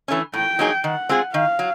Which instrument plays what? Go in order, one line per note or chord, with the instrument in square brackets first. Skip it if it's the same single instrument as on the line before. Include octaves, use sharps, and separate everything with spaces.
[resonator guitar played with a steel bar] E3 A3 C#4
[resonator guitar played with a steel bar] A2 [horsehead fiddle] G5
[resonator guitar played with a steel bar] F#3 A#3 D#4 G#4
[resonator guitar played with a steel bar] D#3 [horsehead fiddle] F#5
[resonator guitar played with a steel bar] G#3 C4 F4 G#4
[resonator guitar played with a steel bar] D#3 [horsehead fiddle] F5
[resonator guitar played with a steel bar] F#3